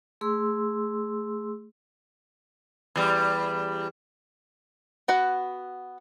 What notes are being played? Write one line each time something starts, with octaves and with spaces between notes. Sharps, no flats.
A3 G#4 C6 E6
E2 G3
B3 F#4 B4 F#5